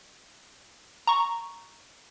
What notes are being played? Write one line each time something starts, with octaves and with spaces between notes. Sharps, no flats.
A#5 C#6